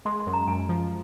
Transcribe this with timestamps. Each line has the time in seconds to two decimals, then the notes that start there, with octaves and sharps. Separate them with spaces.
0.05 G#3 C6
0.20 C6
0.26 F#2
0.33 A#5
0.47 F#2 G#5
0.69 F3